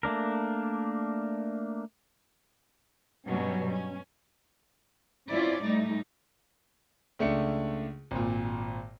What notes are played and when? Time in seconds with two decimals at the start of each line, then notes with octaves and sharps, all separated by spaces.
0.03 A3 A#3 D4 A#4
3.27 G2 B2 F#3 G3 C#4
3.67 C#4
5.29 C4 C#4 E4 F4 D5
5.62 A2 G3 A3 D#4
7.19 C#2 A3 D4 C#7
8.11 G#1 A#2